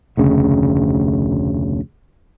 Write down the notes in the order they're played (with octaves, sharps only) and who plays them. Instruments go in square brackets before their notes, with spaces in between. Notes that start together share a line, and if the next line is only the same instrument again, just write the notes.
[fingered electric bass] F1 D2 C#3